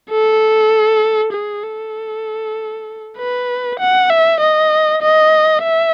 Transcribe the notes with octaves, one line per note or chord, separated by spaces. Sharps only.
A4
G#4
A4
B4
F#5
E5
D#5
D#5
E5